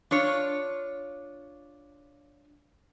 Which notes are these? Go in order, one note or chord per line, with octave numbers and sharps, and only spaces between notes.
D4 F4 C#5